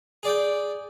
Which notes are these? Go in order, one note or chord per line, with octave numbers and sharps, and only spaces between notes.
G#4 D5 G5